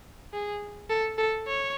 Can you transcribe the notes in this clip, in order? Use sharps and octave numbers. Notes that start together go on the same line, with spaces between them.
G#4
A4
A4
C#5